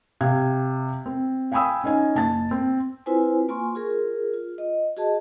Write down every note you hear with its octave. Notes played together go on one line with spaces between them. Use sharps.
C3 F5 G#6
C4
F5 G5 G#5 B5 D#6 E6
C#4 D#4 G#5
F#1 A5 A6
C4
C4 E4 F4 B4 C5 G#5
A#3 F4 G#5 C6 C#6
F4 G#4 A#4
F4
D#5
F#4 G#4 D#5 A5